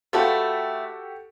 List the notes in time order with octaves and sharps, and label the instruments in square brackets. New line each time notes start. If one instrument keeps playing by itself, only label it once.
[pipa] F3 A3 B4 [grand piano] F#4 G4 A4